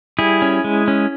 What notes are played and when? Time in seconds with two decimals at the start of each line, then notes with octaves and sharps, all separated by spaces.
0.19 G3 E4 G#4
0.42 C#4
0.64 G#3
0.88 C#4